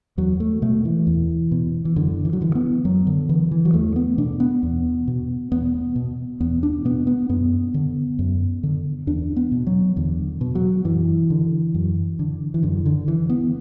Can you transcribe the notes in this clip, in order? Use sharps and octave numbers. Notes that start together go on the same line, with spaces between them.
E2 F#3
A3
B2 A3
E3
E2
B2
E3
F#2 D3
E3
F#3
D3 E3
B3
F#2 F#3
D3
D3 E3
E3
F#3
E2 A3
B3
B2 D4
B3
E2
B2
E2 B3
B2
E2 B3
D4
B2 B3
B3
F#2 B3
D3
F#2
D3
E2 D4
B3
B2
F#3
E2 D3
B2
F#3
F#2 E3
D3
F#2
D3
E3
F#2 D3
D3
D3 E3
B3